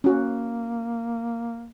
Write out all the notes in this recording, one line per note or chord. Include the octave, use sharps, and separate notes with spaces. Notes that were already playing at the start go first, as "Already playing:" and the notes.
A#3 C#4 F#4